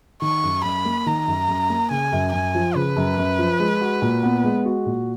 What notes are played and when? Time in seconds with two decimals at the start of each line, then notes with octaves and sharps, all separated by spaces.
0.22 D#3 C#6
0.44 F#2
0.64 F#2 B5
0.85 A#3
1.06 D#3 A#5
1.27 F#2
1.49 F#2
1.70 A#3
1.91 C#3 G#5
2.12 F#2
2.33 F#2 G#5
2.55 F3
2.75 C#3 B4
2.96 F#2
3.18 F#2
3.39 F3
3.59 G#3
3.81 F#4
4.02 A#2
4.23 B3
4.44 G#3
4.65 F#4
4.86 A#2